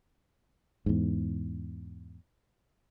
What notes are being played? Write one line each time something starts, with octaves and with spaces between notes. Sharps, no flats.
E2 G#2